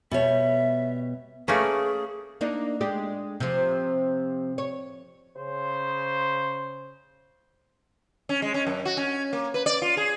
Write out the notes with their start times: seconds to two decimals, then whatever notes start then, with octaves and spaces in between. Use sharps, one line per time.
0.11 B2 G3 C#5 E5
1.48 A3 A#3 C#4 G#4 B4
2.41 A#3 D4 D#4
2.81 G#3 D4 G4
3.40 C3 F3
4.58 C#5
5.37 C#3 C5
8.29 C#4
8.42 G#3
8.54 C#4
8.67 F#2
8.85 F#4
8.97 C#4
9.33 A#3
9.54 B4
9.66 D5
9.82 F4
9.97 G#4